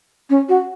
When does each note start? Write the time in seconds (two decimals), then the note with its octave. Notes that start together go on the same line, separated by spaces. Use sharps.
0.30 C#4
0.49 F#4